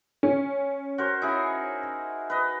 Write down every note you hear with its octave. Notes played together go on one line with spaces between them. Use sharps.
C#4
F#4 A#4 C5
D#4 E4 G#4
B4 D#5